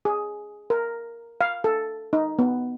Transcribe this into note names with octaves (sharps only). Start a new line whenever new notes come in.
G#4
A#4
F5
A4
D#4
B3